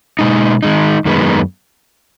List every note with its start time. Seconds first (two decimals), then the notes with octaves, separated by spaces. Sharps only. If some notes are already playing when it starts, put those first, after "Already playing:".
0.19 B2 G#3 D#4
0.63 D#3 G#3 D#4
1.05 F#2 D#3 G#3 B3